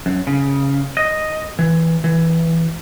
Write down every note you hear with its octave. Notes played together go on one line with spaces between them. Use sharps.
F#2
C#3
D#5
E3
E3